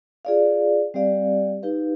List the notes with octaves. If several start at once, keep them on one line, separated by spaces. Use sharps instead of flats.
F4 G#4 D5 F5
G3 C4 G4 D5 F5
D#4 G4 B4 F5